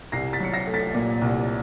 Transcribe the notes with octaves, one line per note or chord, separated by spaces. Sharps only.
C2 A#6 C7
A6 B6
F#3 C#7
A#6 C7
A3
A6 B6
A#2
C2